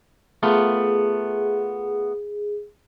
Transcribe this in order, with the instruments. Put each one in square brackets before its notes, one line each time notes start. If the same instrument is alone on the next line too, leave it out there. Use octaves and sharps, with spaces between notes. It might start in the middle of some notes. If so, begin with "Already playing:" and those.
[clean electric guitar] A3 B3 F4 [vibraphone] G#4